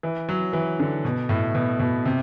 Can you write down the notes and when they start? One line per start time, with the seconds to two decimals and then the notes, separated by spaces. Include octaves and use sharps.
0.03 E3
0.29 F#3
0.53 E3
0.80 D3
1.05 B2
1.29 A2
1.55 B2
1.79 B2
2.05 C3